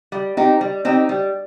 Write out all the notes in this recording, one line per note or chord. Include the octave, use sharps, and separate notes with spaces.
G3
C4 D#4 G4
G3
C4 D#4 G4
G3